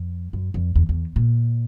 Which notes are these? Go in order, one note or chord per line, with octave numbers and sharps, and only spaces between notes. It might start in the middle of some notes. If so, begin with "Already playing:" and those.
Already playing: F2
F#2
F2
E2
E2
A#2